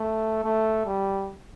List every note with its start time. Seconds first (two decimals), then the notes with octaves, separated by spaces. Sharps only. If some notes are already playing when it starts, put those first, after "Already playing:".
Already playing: A3
0.44 A3
0.86 G3